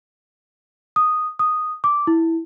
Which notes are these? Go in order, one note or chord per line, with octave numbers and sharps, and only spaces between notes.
D#6
D#6
D6
E4